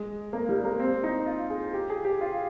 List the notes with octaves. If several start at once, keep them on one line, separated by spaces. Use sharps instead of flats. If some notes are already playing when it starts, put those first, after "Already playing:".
Already playing: G#3
A#3
G3
A#3
C4
D#4
F4
G#4
G4
G#4
G4
F4